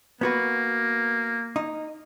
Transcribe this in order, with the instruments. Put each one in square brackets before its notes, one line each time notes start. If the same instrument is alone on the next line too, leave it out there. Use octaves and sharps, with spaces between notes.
[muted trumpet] A#3 [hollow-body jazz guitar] B3 F#4 B4
[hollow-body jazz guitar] D#4